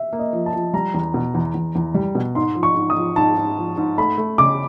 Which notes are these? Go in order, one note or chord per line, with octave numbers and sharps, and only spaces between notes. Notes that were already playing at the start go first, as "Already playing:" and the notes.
Already playing: E5
A#3
D#5
F3
A5
F3
G3 A#5
E2
B2
E2
E2
E2
G3
B2
G#2 C6
F3
C#6
G#2
D#6
F3
G#2 A5
G#2
F3
G#2
A3 B5
A3
C#3 D6